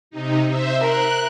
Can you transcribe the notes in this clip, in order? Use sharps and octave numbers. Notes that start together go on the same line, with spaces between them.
C3 D#4
C5 E5
A#4 F#6